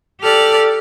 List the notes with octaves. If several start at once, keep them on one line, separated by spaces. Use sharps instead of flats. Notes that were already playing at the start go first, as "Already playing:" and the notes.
G4 A4 D5 F6